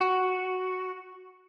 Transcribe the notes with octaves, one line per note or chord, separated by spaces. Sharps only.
F#4